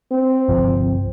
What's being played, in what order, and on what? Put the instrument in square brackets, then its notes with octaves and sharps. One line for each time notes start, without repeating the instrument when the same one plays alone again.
[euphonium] C4
[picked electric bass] G1 C2 F3